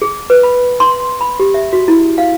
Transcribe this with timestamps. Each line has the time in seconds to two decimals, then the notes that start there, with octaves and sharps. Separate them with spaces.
0.02 G#4
0.30 B4
0.43 B5
0.80 C6
1.21 B5
1.40 G4
1.54 E5
1.73 F#4
1.88 E4
2.18 F5